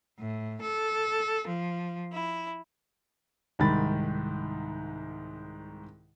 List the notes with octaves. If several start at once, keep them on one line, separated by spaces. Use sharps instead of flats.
A2
A4
F3
E4
C2 G#2 D#3 B5 A6